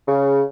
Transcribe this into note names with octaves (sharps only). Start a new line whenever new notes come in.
C#3